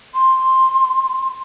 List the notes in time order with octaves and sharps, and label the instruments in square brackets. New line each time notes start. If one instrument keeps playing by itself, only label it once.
[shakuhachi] C6